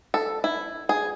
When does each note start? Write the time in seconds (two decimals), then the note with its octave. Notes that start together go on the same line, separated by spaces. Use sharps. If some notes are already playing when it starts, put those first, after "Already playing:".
0.14 A4
0.44 E4
0.89 G#4